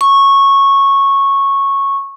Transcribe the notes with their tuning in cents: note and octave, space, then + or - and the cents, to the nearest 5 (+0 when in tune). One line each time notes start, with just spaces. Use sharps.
C#6 -10